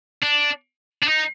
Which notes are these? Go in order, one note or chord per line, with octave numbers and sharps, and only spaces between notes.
D4
D4
D#4